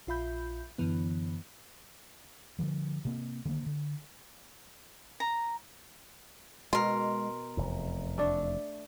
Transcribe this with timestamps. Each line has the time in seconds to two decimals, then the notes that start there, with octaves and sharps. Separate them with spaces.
0.07 A#1 F4 E5 B5 G6
0.78 F#2 D3 E3 B3
2.59 D3 D#3 F3 G3
3.05 C3 A#3 C4
3.45 D3 D#3 A3 A#3
3.66 D3
5.20 A#5
6.73 B2 G#3 A#4 C6
7.57 F1 E2
8.18 A3 D4